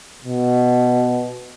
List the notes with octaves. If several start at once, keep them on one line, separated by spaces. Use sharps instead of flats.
B2